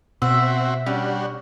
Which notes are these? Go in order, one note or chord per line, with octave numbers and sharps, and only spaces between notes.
B2 C4 F#4 E5
G3 C#4 D4 F#4